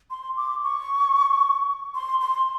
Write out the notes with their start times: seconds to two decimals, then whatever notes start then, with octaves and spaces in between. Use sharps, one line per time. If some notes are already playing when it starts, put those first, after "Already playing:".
0.11 C6
0.37 D6
0.63 C#6
1.95 C6
2.21 C6